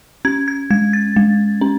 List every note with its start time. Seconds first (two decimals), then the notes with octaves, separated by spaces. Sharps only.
0.25 C#4 G#6
0.48 G#6
0.71 G#3 G#6
0.93 A6
1.16 G#3
1.61 C#4